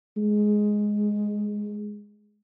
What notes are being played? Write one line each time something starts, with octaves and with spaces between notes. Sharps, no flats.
G#3